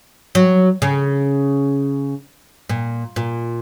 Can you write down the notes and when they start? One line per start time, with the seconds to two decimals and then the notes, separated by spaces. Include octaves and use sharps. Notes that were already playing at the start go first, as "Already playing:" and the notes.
0.35 F#3
0.82 C#3
2.69 A#2
3.16 A#2